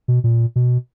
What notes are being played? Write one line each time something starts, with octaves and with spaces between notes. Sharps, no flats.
B2
A#2
B2